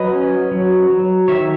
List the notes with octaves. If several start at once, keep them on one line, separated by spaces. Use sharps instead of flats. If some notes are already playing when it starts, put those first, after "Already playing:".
Already playing: F#3 B4 D#5
C#4
F#3
F#3
D#3 C#5 E5